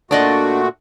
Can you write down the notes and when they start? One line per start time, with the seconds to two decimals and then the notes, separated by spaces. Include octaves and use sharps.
0.11 A#2 A3 D4 F#4 D5 D#5